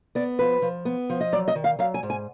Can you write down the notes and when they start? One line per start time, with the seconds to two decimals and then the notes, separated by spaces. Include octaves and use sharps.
0.15 B3 D5
0.39 F3 B4
0.62 F3
0.85 B3
1.10 F3
1.21 D#5
1.32 F#3 D5
1.48 D#5
1.55 D#3
1.64 F5
1.79 F#3 F5
1.94 G#5
2.03 G#2
2.10 G#5